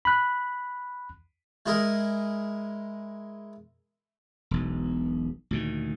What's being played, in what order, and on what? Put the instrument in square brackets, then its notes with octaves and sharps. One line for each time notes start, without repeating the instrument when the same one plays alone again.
[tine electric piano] B5 F#6
[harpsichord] G#3 E4 G#4 A#4
[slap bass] E1 B1
D2 A#2 D#3